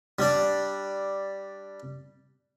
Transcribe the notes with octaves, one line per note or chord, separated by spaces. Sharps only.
G3 D4